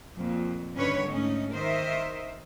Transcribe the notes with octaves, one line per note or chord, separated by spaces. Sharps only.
F2 A#2
G2 D3 D#3 C#4 B4 C#5
G#2 A3 C#4 D#4
D#3 A#4 C5 D#5 E5